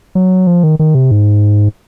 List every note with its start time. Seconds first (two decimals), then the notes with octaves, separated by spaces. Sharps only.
0.15 F#3
0.47 F3
0.64 D#3
0.79 D#3
0.95 C3
1.11 G#2